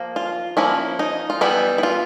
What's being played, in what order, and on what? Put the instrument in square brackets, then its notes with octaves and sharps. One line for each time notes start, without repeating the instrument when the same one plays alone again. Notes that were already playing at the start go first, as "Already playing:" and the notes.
Already playing: [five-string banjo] F3 A#3
F4
F3 A#3 C#4 E4
D#4
F4
E3 G3 B3 E4
E4
F4